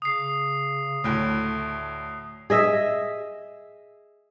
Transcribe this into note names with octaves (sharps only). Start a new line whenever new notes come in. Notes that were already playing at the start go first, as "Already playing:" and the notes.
C#3 D#6 C7
D2 A2 A3
G#4 D#5 E5